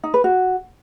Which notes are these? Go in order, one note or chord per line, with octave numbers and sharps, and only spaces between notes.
D#4
B4
F#4